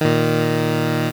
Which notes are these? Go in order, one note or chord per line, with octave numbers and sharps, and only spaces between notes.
A#2 D#3